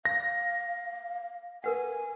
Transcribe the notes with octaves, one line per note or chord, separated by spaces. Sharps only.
F5 A#6
A#4 B4 F#5 G#5